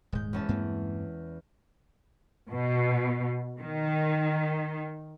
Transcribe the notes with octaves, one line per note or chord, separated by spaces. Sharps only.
D#1 G#2 G#3 G6
E2 C#4 A5
G2 A#3 C4
B2
D#3